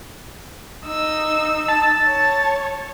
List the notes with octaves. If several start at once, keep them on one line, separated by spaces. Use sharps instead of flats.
D#4 E6
A5
C#5